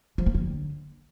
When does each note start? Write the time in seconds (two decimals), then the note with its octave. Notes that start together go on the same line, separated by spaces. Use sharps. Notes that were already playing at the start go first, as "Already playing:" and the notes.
0.18 F3
0.26 A#3
0.34 D3